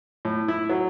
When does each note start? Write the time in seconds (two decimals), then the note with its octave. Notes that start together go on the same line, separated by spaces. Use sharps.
0.25 A2
0.48 E4
0.69 F#3